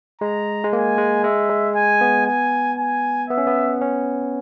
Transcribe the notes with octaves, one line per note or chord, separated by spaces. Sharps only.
G#3 A#5
G#3
A#3 G#5
G#3
G#3 E5
G#3
G#5
B3
G#5
G#5
B3 E5
C#4
B3
C#4